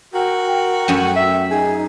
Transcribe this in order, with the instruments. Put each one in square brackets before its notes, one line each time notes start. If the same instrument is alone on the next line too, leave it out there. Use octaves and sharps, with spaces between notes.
[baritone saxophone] F#4 [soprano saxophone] A#4 [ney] G5
[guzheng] F#2 A3 C#4
[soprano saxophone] E5
[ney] D#4 [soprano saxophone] G#4